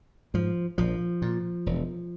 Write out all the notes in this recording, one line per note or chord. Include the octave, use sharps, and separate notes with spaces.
G#2 F3
A#1 F3
A#2
E1